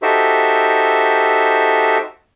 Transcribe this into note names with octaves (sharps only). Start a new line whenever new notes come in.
D#4 F#4 G4 A4 C5 E5